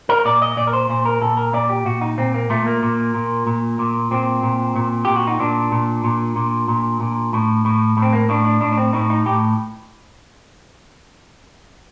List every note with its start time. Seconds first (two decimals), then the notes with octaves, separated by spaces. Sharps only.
0.09 A#4
0.25 A#2 D5
0.42 D#5
0.57 A#2 D5
0.67 A#4
0.73 C5
0.90 A#2 C5
1.05 A#4
1.22 A#2 A4
1.37 A#4
1.53 A#2 D5
1.69 G4
1.86 A#2 F#4
2.02 D#4
2.18 A#2 C4
2.34 A#3
2.50 A#2 A3
2.67 A#3
2.83 A#2
3.14 A#2
3.47 A#2
3.79 A#2
4.11 A#2 C4
4.43 A#2
4.76 A#2
5.05 A#2 G4
5.16 F#4
5.27 D#4
5.40 A#2 D4
5.72 A#2
6.04 A#2
6.36 A#2
6.68 A#2
7.00 A#2
7.33 A2
7.65 A2
7.97 A2
8.02 C4
8.13 A#3
8.29 A2 D4
8.45 D4
8.61 A2 D4
8.72 D4
8.78 C4
8.93 A2 D#4
9.10 D#4
9.26 A2 G4